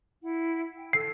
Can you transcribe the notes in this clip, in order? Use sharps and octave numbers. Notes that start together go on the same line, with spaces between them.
E4 F#5
G5
A4 E6 C7